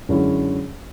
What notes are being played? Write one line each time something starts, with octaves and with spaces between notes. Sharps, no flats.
F#2 D3 G#3 C#4 E4